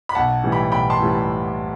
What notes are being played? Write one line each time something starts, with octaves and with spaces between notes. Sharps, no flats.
B5
B1 F#5 A5
A2 E3 G3
G5 B5
B1 G5 B5
A5 C6
A2 E3 G3